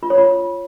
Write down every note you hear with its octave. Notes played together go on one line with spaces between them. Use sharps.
F4
C#5
F4